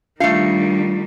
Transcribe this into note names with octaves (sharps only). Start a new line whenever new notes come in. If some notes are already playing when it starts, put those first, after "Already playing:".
D#3 G3 A3 D4 F4 F5 C7 C#7